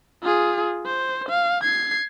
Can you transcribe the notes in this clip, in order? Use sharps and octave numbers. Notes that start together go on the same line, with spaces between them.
F4 G#4
C5
F5
G#6 C7